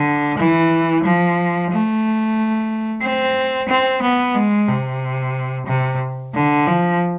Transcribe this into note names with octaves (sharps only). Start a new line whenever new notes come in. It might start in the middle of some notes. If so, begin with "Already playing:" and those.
Already playing: D3
E3
F3
A3
C4
C4
B3
G#3
C3
C3
D3
F3